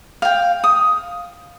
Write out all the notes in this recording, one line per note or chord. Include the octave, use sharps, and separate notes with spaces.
F5 G5
D#6